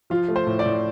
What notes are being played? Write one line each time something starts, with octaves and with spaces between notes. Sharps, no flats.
F3 F4
A3
C5
A2
D5
A2